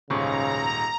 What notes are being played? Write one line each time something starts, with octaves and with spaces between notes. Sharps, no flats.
D#1 G#2 C#3 A#5 C#6